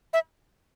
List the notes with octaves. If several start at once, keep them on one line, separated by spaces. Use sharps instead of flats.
E5